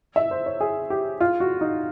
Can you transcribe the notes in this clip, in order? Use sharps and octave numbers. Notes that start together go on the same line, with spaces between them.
E5
C5
C#5
G#4
G4
F4
F#4
D#4